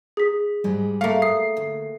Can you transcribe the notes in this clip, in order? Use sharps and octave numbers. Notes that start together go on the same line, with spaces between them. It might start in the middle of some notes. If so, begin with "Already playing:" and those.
G#4 B6
G#2 G3 G#3
A3 A#3 F5
D#6 C7
D2